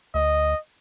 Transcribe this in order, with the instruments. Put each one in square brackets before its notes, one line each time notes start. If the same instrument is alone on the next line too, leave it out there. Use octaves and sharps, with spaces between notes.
[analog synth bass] D2 [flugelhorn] D#5